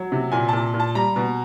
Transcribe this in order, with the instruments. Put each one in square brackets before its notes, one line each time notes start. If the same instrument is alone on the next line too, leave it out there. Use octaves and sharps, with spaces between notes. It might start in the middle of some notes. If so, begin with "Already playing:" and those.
Already playing: [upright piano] F#3
C3
A#2 G#5
A#2 A5
A#2
A5
G3 A#5
B2